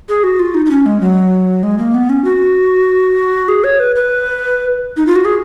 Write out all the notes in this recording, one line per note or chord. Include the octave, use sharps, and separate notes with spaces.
G#4
F#4
F4
D#4
D#4
C#4
G#3
F#3
G#3
A#3
B3
C#4
F#4
G#4
C#5
B4
B4
D#4
F4
F#4
G#4